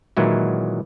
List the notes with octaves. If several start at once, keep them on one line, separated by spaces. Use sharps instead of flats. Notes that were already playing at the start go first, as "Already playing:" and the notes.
A#2 D#3 E3 F#3 G#3 E4